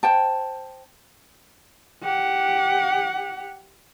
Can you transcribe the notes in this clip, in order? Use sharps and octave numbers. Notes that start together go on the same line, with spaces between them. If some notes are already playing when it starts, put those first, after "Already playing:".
C5 G5 A5
G4 F#5